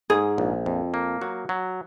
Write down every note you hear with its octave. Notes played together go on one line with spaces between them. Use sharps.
G#2 G#4
A#1
F2
A#3
F#3 F#4
F#3